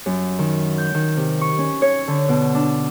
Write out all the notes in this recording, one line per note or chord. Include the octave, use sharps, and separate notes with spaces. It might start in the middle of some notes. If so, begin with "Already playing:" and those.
F#2
D#3
G6
D#3
C3
C#6
C#4
C#5
D3
B2
D4